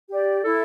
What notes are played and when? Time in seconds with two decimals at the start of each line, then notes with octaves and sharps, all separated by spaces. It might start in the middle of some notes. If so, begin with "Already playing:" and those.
0.09 G4 D5
0.45 E4 A4